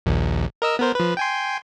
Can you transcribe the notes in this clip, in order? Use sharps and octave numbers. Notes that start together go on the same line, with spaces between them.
A#1 D#2
A#4 D#5 E6
B3 A#4 C5
F3 B4
G5 G#5 C6